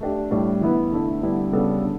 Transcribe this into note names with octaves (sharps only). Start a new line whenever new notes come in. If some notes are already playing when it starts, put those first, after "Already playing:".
A3 D4 G4
A2 G3 D4
E3 B3 E4 B4
D3 A3 E4
D3 G3 B3 E4
C#3 G3 B3 D4 A4
D3